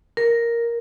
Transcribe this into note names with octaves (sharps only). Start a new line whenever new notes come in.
A#4